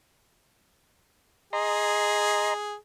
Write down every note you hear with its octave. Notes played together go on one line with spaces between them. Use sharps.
G#4 D#5 A#5 C6